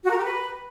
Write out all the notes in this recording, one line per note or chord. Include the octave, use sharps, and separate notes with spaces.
F#4
A#4
G4
B4